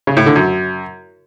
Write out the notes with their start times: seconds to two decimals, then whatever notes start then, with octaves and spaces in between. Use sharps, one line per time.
0.07 C#3
0.17 A2
0.26 D3
0.36 F#2